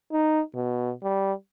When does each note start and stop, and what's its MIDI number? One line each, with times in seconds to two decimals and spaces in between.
0.12 0.41 63
0.55 0.91 47
1.03 1.33 55